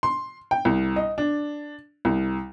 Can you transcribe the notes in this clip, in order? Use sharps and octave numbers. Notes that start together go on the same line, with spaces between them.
C6
G5
C2
D#5
D4
C2